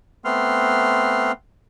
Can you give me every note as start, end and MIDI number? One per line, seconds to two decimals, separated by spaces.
0.25 1.32 57
0.25 1.32 59
0.25 1.32 60
0.25 1.32 84
0.25 1.32 89